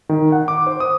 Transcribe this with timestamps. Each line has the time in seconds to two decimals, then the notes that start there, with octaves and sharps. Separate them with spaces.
0.09 D#3
0.32 F#5
0.48 D6
0.67 C5
0.80 D#6